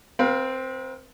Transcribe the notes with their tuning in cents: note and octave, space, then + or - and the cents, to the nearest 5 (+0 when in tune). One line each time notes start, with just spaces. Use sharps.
C4 +0 B4 -45 F5 +15